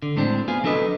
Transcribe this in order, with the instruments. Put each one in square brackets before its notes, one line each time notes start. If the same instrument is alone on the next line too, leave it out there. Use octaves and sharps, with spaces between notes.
[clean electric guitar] D3
A2 G#3 C4 D4
B3 F4 G#4
F#3 D4 A4 B4 D#5